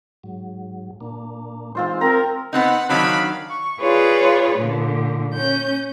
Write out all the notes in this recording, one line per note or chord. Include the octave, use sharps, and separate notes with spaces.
G#2 F#3
A#2 A#3 D4
E3 G#3 C4 D#4 F4 C5
C4 A#4 A#5
B3 C4 D#4 F#5
D#3 F#3 C4 D4 D#5 F5 B5
C#6
F4 G#4 B4 C#5 D5
A#2 D3
C#4 G6